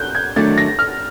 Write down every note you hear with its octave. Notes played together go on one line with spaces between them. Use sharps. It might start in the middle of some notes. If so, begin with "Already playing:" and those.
Already playing: F#6 G6
G#6
D#3 F#3 A3 D4 A6
A#6
F6